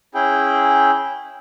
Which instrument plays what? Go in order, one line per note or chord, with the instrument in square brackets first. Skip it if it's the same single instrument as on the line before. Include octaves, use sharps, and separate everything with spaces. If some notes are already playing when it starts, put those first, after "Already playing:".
[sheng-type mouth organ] C#4 E4 G#4 G5